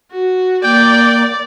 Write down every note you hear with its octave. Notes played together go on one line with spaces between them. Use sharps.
F#4
A#3 D5 G5